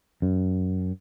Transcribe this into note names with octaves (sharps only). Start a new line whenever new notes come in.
F#2